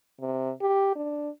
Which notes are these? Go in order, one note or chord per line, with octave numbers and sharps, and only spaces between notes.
C3
G4
D4